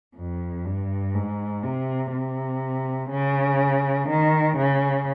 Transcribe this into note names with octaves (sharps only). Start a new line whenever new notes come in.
F2
G2
G#2
C3
C3
C#3
D#3
C#3